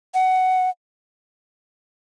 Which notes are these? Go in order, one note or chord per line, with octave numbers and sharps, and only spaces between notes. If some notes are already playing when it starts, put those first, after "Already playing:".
F#5